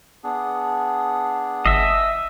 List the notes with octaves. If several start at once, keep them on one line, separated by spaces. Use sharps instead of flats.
B3 D4 G#4
G1 D#5 E5